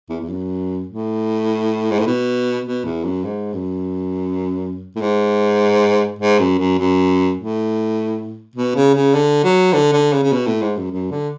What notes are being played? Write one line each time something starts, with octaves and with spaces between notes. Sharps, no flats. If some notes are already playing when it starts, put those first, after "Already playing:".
E2
E2
F#2
A2
G#2
A2
B2
B2
E2
F#2
G#2
F#2
A2
G#2
G#2
F#2
F#2
F#2
A2
B2
C#3
C#3
D3
F#3
D3
D3
C#3
C#3
B2
A2
G#2
F#2
F#2
D3